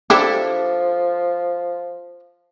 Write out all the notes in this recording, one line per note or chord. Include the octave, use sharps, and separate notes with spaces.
F3 D4 E4 G4 A4